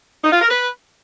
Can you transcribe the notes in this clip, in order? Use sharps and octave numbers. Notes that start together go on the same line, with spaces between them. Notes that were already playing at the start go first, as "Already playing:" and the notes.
D#4
F4
A#4
B4